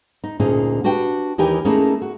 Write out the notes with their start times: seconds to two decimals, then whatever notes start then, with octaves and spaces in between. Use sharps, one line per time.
0.24 D#4
0.40 D2 A#2 C#4 D#4 G#4
0.84 D4 F#4 G4 B4 G5
1.38 D#2 E3 D#4 G4 A#4 G#5
1.65 A3 A#3 C#4 D#4 E4 G#4
2.02 F#4